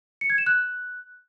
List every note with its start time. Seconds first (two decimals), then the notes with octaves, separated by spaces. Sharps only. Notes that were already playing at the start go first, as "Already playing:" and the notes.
0.21 C#7
0.30 G#6
0.38 E7
0.46 F#6